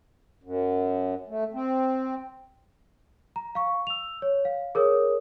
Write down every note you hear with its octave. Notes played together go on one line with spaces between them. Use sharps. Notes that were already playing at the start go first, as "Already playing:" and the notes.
F#2
A3
C4
A#5
F5 C#6
E6 F7
C#5
F5
G#4 A#4 C#5 D#6